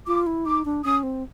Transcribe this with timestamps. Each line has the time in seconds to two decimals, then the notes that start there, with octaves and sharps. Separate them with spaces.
0.07 F4 D6
0.27 E4
0.46 D#4 D6
0.65 D4
0.84 C#4 D#6
1.03 C4